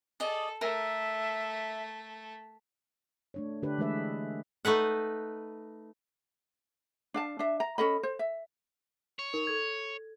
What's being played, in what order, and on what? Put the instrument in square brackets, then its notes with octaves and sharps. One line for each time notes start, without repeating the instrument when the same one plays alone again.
[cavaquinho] G#4 D5 D#5 [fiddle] A4
[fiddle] A3 [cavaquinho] A#4 [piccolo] E5
[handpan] A3 D4 C#5
D3 D4 G4 B4
E3 G#3 A3 G#4 B4 E5
[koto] A3 D#4 B4 F#5
[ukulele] D4 F5 A5
D4 E5
A#5
C#4 A4 D#5 B5
C5
E5
[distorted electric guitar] C#5
[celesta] D#4 A#4
A4 G#6